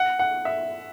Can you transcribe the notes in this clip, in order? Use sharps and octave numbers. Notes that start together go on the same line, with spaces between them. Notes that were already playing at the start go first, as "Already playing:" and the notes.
Already playing: F#5
F#5
E5